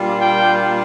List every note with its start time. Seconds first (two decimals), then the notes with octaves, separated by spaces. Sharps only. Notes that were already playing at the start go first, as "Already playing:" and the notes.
Already playing: A#2 G3 A#3 D4 F4
0.19 G5